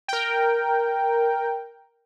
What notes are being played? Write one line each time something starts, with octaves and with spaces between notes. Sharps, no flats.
A#4 G5